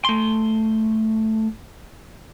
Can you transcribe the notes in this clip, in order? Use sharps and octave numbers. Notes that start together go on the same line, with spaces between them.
A3 C6